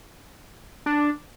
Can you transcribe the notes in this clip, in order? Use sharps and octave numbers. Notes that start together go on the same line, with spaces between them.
D4